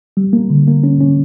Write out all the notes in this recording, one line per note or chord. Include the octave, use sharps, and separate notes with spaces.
G3
A#3
D3
A#3
C#4
C#4